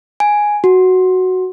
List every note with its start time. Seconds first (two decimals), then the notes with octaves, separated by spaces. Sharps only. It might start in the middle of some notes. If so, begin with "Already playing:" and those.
0.20 G#5
0.64 F#4